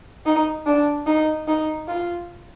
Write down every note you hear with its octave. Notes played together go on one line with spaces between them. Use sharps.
D#4
D4
D#4
D#4
F4